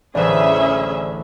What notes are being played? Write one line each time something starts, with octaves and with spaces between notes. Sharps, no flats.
A1 D2 E3 C#4 G#4 C5 D5 E5